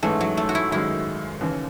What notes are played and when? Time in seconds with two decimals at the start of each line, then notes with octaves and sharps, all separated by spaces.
0.03 G#2 E3 G#3 A3 C#4
0.21 F#3
0.37 A3
0.49 F#4
0.55 E4
0.72 G#1 F#2 D#3 G#3 E4
1.41 D#2 C#3 E3